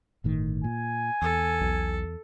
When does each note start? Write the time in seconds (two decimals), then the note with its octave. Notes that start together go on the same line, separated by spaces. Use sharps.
0.24 G1 A2 D#3
0.64 A#2 G#5
1.22 E2 A4
1.61 B1